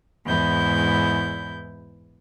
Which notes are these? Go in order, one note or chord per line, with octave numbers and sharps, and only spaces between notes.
E2 G#2 E4 G6